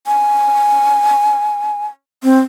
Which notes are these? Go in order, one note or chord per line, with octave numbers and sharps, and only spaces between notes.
G#5
C4